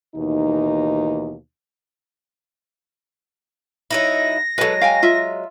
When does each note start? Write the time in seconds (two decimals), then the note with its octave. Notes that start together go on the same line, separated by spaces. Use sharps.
0.15 D#2 B2 E3 D#4
3.91 F#3 D#4 E4 A#6
4.58 F#3 G#3 A4 B4
4.81 F5 G5 G#5
5.03 F4 E5